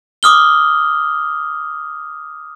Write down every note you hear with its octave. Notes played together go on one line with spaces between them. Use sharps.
D6 D#6 F6 G7